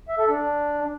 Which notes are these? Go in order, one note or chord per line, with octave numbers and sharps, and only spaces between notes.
E5
A4
D4